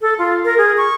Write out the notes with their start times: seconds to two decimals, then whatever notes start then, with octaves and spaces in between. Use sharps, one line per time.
0.01 A4
0.19 F4
0.45 A#4
0.58 G#4
0.77 C#6